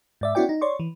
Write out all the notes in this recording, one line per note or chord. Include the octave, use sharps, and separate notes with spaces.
G#2 D5 E5
B3 C#4 E4 F#4 D5 G5
D#4
C#5 D5 C6 C#6
E3